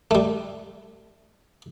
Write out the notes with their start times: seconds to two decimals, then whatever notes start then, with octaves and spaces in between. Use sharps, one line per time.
0.11 G3 A3